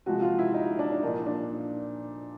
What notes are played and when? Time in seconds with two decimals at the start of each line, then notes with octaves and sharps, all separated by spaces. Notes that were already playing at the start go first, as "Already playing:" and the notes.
0.06 C3 F3 G#3 F#4
0.22 F4
0.39 E4
0.54 D#4
0.79 D4
0.92 D4
1.03 A#2 F3 A#3 D#4
1.27 D4